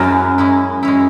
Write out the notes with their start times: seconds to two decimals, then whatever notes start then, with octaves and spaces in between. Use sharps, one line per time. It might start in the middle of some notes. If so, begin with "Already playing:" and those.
Already playing: F#2 G#3 C#4 E4
0.38 G#3 C#4 E4
0.83 G#3 C#4 E4